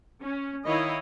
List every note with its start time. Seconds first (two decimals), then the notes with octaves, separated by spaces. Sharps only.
0.22 C#4
0.66 D#3 E4 C#5 D#5 F5 B5